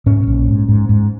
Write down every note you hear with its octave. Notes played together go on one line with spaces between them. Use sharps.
G#2 C#4
A#1
G#2
G#2
G#2